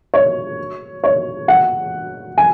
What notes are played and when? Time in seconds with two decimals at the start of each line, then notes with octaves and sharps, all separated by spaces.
0.14 C#5
1.04 C#5
1.48 F#5
2.38 G#5